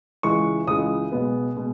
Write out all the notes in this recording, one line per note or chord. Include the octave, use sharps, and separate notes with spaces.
C#2 C#3 E3 G#3 C#6
C#2 C#3 E3 G#3 D#6
B1 B2 G#3 B3
B2 G#3